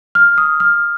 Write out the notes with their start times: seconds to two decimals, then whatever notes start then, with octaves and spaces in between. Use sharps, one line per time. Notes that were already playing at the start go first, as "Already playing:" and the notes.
0.15 F6
0.38 D#6
0.60 F6